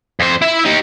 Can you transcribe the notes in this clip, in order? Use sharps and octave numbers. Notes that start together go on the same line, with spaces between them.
F2 C5
E4 E5
D#4 G4